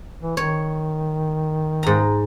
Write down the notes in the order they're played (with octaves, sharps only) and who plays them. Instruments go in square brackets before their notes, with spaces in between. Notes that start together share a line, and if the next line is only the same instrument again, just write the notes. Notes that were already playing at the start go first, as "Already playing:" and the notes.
[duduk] E3
[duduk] D#3 [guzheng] C#5
[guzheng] G#2 A#5